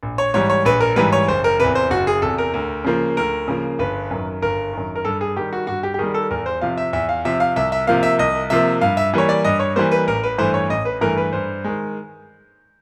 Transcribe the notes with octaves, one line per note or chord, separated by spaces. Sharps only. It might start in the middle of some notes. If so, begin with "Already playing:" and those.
A#1
C#5
G#2 E3 G3 C#5
C#5
A#1 B4
A#4
G#2 E3 G3 B4
C#5
F#1 C5
A#4
E2 C3 B4
C5
F#1 F#4
G#4
E2 C3 A4
A#4
D2
C#3 F3 A#3
D2 A#4
C#3 F3 A#3
G1 B4
F#2 D#3
G1 A#4
F#2 D#3
A#4
G2 A4
G#4
D#3 G3 G4
F#4
G2 F#4
G4
G4
D#3 G3 G#4
A4
E2 A#4
C5
C3 F3 F5
E5
E2 E5
F5
C3 F3 E5
F5
C2 E5
E5
C3 F3 A#3 F5
E5
C2 D#5
C3 F3 A#3 E5
G2 F5
E5
E3 G3 A#3 C#5
D5
G2 D#5
C#5
E3 G3 A#3 C5
B4
A1 A#4
B4
G2 E3 A3 C5
C#5
A1 D#5
B4
G2 E3 A3 A#4
B4
G2 C5
D#3 G#3